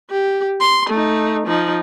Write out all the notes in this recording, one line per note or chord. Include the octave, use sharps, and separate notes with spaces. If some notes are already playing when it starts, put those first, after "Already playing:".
G4
C6
A3 D#4
F3 D#4